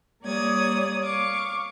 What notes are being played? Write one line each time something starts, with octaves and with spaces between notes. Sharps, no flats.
G3 A#3 C#5 D5 D#6 G#6
F5 C#6 D6